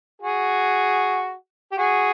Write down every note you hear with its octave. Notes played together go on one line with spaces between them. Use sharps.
F#4 G#4
G4
F#4 G#4